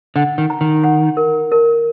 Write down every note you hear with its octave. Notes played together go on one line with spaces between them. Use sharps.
D3 F#5
D#3
A#5
D#3
F#5
A#4
A#4